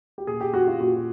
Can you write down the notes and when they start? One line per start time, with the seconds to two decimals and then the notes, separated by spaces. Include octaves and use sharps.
0.18 G4
0.27 A#2 G#4
0.41 G4
0.54 F#4
0.68 F4
0.81 A#2 F#4